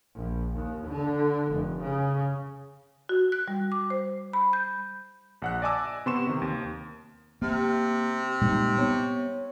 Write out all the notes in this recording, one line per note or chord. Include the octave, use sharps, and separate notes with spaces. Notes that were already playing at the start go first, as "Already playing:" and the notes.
A#1
D#2
D3
F1
C#3
F#4
F#6
G3
D6
C5
B5
G6
A#1 F#5 F#6
D5 D#5 G#5 A5 D6 E6
C3 B3 C6 C#6 E7
C3 D#3
D#2
C3 A#3 G4
A#2 G3 G#3 D#4
B3 C#5